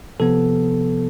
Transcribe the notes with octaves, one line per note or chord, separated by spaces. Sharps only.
C3 F3 B3 A4